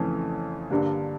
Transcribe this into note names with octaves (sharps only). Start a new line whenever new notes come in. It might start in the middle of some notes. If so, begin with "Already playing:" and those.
Already playing: F2 C#3 E3 A3 C#4
G2 D3 G3 A#3 D4